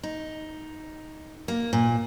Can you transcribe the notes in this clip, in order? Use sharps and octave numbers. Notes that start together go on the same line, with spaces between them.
D#4
A#3
A#2